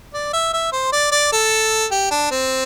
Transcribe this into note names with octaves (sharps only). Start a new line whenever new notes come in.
D5
E5
E5
C5
D5
D5
A4
G4
D4
C4